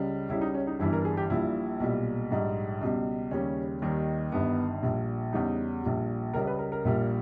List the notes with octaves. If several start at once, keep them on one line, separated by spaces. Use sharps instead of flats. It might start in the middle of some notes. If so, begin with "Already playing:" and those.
Already playing: C#2 C#3 G3
C#2 C#3 G3 E4
D#4
C#4
D#4
G1 G2 E3 G3 E4
A#4
G#4
G4
A#1 A#2 G3 E4
B1 A#2 G3
A#1 G#2 G3
C#2 B2 G3
D#2 C#3 G3 C#4
D#2 D#3 G3
G1 G2 D#3 B3
A#1 A#2 G3
E2 C#3 G3 D#4
A#1 A#2 G3
C#2 C#3 G3 A#4
B4
A#4
A#4
A#1 A#2 G3